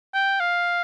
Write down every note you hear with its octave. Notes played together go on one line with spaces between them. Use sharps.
G5
F5